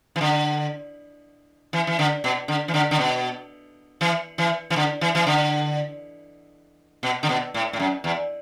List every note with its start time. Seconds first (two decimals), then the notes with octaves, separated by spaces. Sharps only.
0.16 E3
0.21 D3
1.73 E3
1.87 E3
1.99 D3
2.24 B2
2.48 D3
2.68 E3
2.74 D3
2.91 D3
2.99 B2
4.01 E3
4.38 E3
4.70 E3
4.76 D3
5.01 E3
5.15 E3
5.27 D3
7.03 B2
7.23 D3
7.29 B2
7.54 A2
7.73 A2
7.79 F#2
8.04 E2